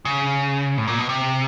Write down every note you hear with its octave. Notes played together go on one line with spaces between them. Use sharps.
C#3
A2
A#2
B2
C3